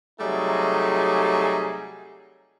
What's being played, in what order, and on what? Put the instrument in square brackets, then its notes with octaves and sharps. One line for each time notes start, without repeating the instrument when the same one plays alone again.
[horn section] C3 F#3 G3 A3 D#4 G#4